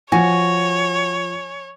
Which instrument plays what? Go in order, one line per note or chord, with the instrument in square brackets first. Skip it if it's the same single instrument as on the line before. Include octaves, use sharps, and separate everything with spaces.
[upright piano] F3 [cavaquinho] F#4 [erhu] C#5 [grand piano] G#5